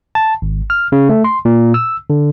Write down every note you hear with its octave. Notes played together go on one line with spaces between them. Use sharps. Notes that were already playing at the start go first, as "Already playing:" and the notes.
A5
G#1
F6
C#3
A3
C6
A#2
E6
D3